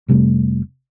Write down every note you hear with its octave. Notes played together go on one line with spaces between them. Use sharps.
F1 C3 G3 A3